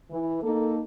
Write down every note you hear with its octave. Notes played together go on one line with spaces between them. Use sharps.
E3
A#3 D#4 A4